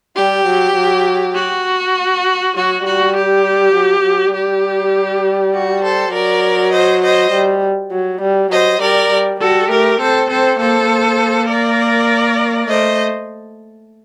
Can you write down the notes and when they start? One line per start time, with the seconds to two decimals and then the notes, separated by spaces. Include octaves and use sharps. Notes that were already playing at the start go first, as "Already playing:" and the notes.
0.16 G3 G4
0.46 F#3
0.76 F#3
1.36 F#4
2.55 F#3 F#4
2.85 G3 F#4
3.15 G4
3.74 F#3
4.04 F#3
4.34 G3 G4
5.54 F#4
5.83 A4 C5
6.12 F#3 A#4 D5
6.72 C5 D#5
7.02 C5 D#5
7.32 G3
7.92 F#3
8.21 G3
8.51 F#3 C5 D#5
8.81 G3 A#4 D5
9.10 G3
9.40 G3 F#4 A4
9.70 A3 G4 A#4
10.00 C4 A4 C5
10.30 C4 A4 C5
10.59 A#3 A4 C5
10.90 A#3
11.49 A#4 D5
12.68 A3 C5 D#5